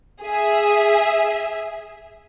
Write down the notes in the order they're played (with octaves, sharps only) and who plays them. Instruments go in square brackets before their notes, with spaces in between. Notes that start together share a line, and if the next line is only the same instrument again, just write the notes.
[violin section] G#4 E5